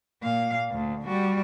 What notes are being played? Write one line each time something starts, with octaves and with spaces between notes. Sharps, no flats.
A#2 F5
D2
G3 F#4